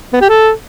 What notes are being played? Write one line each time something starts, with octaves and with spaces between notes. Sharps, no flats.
B3
G4
A4